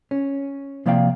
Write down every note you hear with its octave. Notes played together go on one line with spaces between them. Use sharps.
C#4
C3 F3 A#3 D5 F5 G5